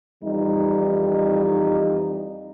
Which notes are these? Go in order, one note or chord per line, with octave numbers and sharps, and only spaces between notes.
F2 E3 G3 D#4